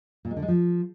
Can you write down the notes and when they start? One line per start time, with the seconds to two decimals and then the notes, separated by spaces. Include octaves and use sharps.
0.25 A#2
0.31 G#3
0.36 D3
0.42 G#3
0.48 F3